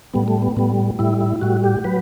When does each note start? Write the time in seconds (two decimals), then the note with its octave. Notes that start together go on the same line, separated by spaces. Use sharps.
0.14 A2 G3 B3
0.28 A3
0.42 B3
0.57 A2 G3 B3
0.99 A2 G3 E4
1.21 E4
1.41 A2 G3 F#4
1.64 G4
1.84 F#3 B4